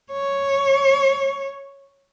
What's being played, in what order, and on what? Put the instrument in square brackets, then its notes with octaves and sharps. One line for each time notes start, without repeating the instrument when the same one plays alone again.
[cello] C#5